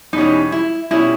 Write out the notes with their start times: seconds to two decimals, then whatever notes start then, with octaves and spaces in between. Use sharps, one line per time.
0.13 E2 B2 G3 C#4 D#4
0.52 E4
0.91 B2 G3 C#4 E4